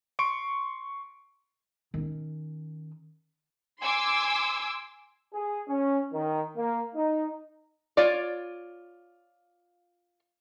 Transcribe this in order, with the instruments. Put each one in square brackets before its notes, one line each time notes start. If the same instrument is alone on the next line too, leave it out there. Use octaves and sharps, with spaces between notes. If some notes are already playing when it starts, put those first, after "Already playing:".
[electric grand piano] C6 C#6 D7
[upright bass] D#3 C#4
[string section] G#5 C6 D6 E6
[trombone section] G#4
C#4
D#3
A#3
D#4
[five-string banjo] F4 C#5 D5